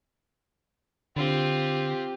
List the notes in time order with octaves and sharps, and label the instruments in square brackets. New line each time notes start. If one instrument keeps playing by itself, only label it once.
[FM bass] D3 [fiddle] C4 F4 [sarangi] G4